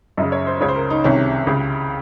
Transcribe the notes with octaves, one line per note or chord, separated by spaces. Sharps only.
F#2 C#3 D#5
C#5
C5
C#2 C#3 C#5
C5
A#4
D#4
C2 C3 D#3 C#4
C#2 C#3